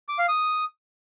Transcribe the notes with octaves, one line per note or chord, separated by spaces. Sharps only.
D6
F5
D#6